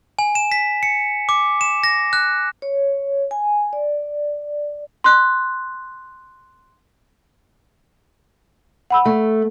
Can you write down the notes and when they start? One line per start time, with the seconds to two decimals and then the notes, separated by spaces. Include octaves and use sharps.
0.19 G#5
0.35 E7
0.52 B6
0.83 C#7
1.29 D6
1.61 E7
1.84 A#6
2.13 F#6
2.62 C#5
3.31 G#5
3.73 D5
5.04 C6 F#6
8.90 F#5 B5 E6
9.05 A3